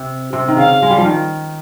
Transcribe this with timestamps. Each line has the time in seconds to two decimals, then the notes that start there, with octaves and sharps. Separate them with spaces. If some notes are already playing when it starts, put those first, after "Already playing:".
Already playing: C3
0.33 C3
0.48 D#3
0.57 C#3 F5
0.82 G#3
0.90 G3
0.98 F3
1.05 D#3